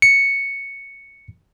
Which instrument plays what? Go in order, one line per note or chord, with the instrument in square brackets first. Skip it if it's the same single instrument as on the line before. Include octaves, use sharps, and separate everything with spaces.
[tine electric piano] C#7